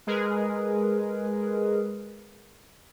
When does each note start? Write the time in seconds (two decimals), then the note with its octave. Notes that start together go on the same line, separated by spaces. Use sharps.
0.07 G#3 G#4 A#4 B4